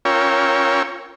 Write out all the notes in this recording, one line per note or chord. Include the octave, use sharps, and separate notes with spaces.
C#4 F4 A#4 C#5 G5 E6